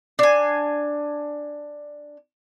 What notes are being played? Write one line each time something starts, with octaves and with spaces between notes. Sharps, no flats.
D4 G#5